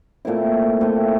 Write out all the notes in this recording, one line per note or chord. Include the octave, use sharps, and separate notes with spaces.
A#2 A3 C4 E4
A#2 A3 C4 E4